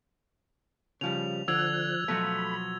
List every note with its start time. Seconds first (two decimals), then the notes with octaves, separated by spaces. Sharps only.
1.01 C#3 F3 G3 F7
1.48 D3 F3 E6 F#6 G#6 F7
2.08 B2 F3 F#3 A3 B5